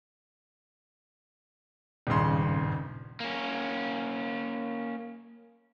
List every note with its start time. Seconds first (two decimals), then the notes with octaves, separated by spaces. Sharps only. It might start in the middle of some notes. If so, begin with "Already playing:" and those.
2.07 D#1 G#1 G2 C#3 C6
3.20 A#3 C#4